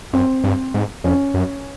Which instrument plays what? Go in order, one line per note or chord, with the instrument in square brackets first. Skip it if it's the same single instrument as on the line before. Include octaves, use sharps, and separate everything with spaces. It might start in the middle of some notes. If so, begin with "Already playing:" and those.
[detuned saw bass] F#2 [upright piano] C4
[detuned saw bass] G2
G#2
[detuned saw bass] F2 [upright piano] C#4
[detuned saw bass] F#2